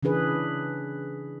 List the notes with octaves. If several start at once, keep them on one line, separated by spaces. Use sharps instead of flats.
C#3 E3 D4 G#4 B4